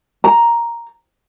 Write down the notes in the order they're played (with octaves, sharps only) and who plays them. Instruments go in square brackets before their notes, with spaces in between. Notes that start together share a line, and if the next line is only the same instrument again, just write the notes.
[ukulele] A#5